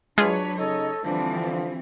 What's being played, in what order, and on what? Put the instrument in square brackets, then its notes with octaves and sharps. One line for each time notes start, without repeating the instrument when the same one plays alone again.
[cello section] F#3 B4 C#5 [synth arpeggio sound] G#3 F4 G#4 [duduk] D4
[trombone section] C#3 D#4 [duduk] A4 [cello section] C#5 D#5
[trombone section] D3 F3 [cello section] E3 G3 C4 [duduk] D4